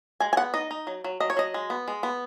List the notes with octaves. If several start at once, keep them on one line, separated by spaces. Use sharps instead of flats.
G#3 G#5
G#5
B3 F#5
D#4 D#5
D#4
F#3
F#3
F#3 D#5
C#5
F#3 D#5
G#3
B3
G#3
B3